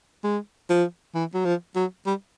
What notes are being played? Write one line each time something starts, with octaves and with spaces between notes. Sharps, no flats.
G#3
F3
E3
F#3
F3
F#3
G3